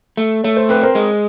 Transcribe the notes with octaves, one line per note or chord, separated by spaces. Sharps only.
A3
A3 C#5
C5
C4 B4
A#4 C5
G#3